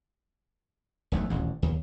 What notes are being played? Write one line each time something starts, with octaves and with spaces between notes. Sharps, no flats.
E1 B1 G2 A3
D#1 A1 D2
D#2